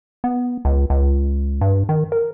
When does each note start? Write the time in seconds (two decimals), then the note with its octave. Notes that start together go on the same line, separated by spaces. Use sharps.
0.24 B3
0.65 C#2
0.90 C#2
1.61 G2
1.89 D#3
2.12 A#4